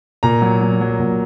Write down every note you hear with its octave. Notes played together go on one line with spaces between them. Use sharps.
A#2 A#5
F#3
F#3
F#3
A#2